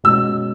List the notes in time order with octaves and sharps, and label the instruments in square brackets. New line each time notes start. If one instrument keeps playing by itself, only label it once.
[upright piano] B2 G#3 C#4 F#4 [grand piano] E6